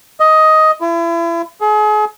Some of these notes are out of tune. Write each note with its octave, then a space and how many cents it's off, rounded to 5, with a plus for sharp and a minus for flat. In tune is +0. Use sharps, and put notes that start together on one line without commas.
D#5 +10
E4 +35
G#4 +35